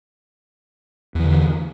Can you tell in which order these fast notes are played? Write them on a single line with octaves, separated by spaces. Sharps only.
E2 E3 D3